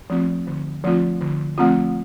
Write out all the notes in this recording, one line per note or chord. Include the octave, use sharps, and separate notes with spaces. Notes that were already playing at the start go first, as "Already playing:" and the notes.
F3 A3 C4 F4
D3
F3 A3 C4 F4
D3
F3 A3 C4 F4